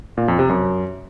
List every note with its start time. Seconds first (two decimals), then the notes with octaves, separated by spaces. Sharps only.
0.17 A#2
0.28 F2
0.39 C3
0.49 F#2